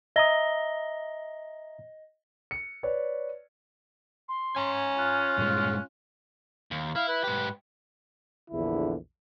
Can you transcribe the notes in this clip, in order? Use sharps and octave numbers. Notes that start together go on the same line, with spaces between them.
D#5 E5 A#5 D#6 A#6 G7
C#7
B4 C#5 D5
C6
C#4 G#5 A#5
F4 F#6
G2 A#2 G#3
D#2
E4 F5
B4
G#2 G4
A#1 E2 D3 E4